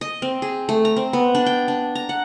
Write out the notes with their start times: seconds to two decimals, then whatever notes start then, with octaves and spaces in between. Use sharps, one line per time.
0.01 D#5
0.22 C4
0.42 G#4
0.69 A3
0.85 A#5
0.96 C4
1.13 B3
1.35 D4
1.46 G5
1.68 D4
1.95 A#5
2.09 F#5